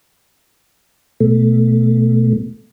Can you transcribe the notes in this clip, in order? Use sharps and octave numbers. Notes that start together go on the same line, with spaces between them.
B2 A3